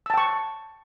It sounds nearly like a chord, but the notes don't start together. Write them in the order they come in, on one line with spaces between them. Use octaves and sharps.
E6 A5 G5 C#6